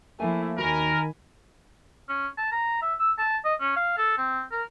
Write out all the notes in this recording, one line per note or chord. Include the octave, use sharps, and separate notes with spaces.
F3 A3 A#3 E4 G#5
D#2 D#3 F#4 A#4 G#5 B5
C#4
A5
A#5
E5
E6
A5
D#5
C#4
F5
A4
C4
A#4